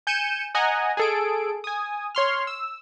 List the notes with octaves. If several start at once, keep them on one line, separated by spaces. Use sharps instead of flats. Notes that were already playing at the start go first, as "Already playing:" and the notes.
G#5 G6 C#7 D#7 E7
D#5 F#5 G#5 A#5
G#4 A4 D7
G#5 D#6
C#5 C6 F6
E6